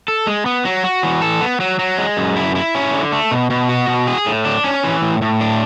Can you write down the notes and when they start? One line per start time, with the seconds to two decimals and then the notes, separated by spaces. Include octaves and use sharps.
0.08 A4
0.27 G#3
0.46 B3
0.65 F#3
0.84 F#4
1.03 E3
1.22 A4
1.41 B3
1.60 F#3
1.79 F#3
1.98 G#3
2.17 F#2
2.36 E4
2.55 E4
2.75 C#4
2.93 D3
3.12 A3
3.31 B2
3.50 B2
3.69 F#4
3.88 B2
4.07 G#4
4.26 A2
4.45 D4
4.64 C#4
4.84 E3
5.02 A2
5.22 A2
5.41 D4